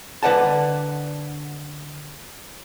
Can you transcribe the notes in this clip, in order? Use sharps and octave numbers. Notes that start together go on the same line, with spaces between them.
D3 B4 D5 F#5 A5